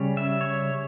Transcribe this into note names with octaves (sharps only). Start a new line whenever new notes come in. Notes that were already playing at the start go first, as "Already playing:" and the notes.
Already playing: C#3 G3 C#4
E5
C#5